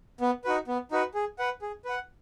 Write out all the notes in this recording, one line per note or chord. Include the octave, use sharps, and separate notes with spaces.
B3
D#4 F#4 B4
B3
D#4 F#4 B4
G#4
B4 F#5
G#4
B4 F#5